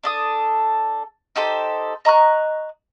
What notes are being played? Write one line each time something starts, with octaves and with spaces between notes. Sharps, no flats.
D4 A4 D#6
D#4 G4 A4 C5
D#5 A#5 C#6 F#6